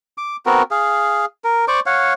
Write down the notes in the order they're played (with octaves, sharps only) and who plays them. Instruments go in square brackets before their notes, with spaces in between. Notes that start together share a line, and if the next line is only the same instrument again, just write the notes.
[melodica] D6
B3 C4 F#4 A#4
G#4 F5
A#4
C5 D5 C#6 D6
C#5 F5 F#5